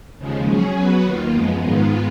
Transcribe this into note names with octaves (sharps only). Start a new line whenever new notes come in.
D#2 C#3 F3 G#3
F#3 C#4 G#4
F#3 B3 F#4 B4
D#2 D#3 A#3 F4
F#2 F3 G#3 B3
G#2 D#3 G#3 B3 F4